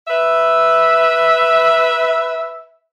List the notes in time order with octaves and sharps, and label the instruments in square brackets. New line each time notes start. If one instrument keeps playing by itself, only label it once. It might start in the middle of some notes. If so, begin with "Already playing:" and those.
[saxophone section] B4 E5